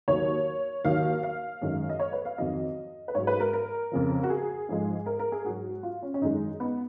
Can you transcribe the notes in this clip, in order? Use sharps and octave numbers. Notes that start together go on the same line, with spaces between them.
D#2 D#3 F#3 C#5
D#2 D#3 F#3 F5
F5
F#2 D#3 G#3
D#5
C#5
B4
F5
F2 D#3 F#3 D#5
B4
G#2 F#3 C#5
B4
A#4
A#4
F2 C#3 F3
F#4
G#4
G#2 F3 G#3
A#4
A#4
G#4
G#2 F#3 F#4
F4
C#4
C#4
F#2 D#3 G#3 D#4
B3